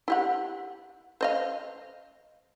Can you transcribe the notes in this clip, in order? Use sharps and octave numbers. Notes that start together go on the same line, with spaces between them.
E4 G4 F#5
C5 D#5 F5